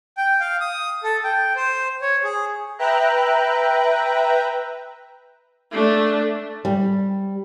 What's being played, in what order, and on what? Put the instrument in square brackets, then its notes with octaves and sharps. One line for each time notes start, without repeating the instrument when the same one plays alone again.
[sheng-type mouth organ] G5
F5
D#6
A4
G5
C5
C#5
G#4
[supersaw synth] B4 E5 G5 A#5 F#6
[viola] A3 D4
[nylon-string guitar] G3